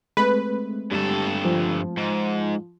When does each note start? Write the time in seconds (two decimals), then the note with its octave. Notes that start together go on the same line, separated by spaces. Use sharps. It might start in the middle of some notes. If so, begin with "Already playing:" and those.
0.17 G#3 A3 C4 B4
0.92 G2 G3 A4
1.45 F3
1.97 G#2